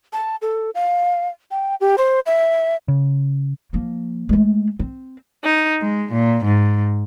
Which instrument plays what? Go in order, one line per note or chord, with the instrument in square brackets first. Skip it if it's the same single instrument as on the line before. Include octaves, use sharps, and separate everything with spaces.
[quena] A5
A4
F5
G5
G4
C5
E5
[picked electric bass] C#3
[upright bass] F3 A#3
G#3 A3
C4
[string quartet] D#4
G#3
A#2
G#2